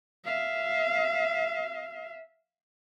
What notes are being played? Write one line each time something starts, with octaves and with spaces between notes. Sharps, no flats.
E5 F5